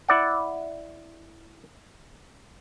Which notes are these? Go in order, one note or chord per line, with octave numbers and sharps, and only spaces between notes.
E4 D5 F#5